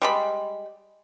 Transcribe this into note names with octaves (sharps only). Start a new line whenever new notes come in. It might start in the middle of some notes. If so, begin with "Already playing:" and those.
G3 G#3 B5